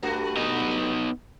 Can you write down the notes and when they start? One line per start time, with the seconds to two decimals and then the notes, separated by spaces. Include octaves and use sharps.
0.02 G2 A3 F#4
0.37 B3 D#4 D#5